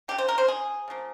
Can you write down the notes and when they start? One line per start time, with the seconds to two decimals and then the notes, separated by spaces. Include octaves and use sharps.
0.08 C#3 F3 A#3 G4
0.18 C5
0.28 A#4
0.38 C5
0.48 G#4
0.88 C#3 F3 A#3